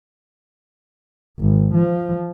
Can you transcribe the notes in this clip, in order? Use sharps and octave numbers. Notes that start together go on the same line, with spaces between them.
G#1
F3